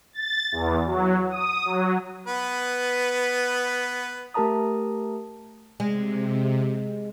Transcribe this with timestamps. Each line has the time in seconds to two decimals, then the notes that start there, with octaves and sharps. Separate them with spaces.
0.13 A6
0.52 E2
0.86 F#3
1.30 D#6
1.65 F#3
2.27 B3 B4
4.34 A3 G4 A#4 A5 A#5 D#6
5.80 C3 G#3